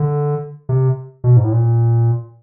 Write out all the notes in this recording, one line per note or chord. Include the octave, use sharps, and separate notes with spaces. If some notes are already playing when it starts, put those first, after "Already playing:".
Already playing: D3
C3
B2
G#2
A2
A#2